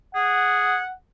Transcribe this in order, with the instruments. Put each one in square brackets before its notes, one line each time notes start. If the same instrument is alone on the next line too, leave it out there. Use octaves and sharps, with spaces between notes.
[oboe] G#4 [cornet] F#5